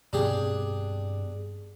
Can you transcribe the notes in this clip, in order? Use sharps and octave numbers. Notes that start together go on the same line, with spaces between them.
G2 B2 C4 D4 G4 G#4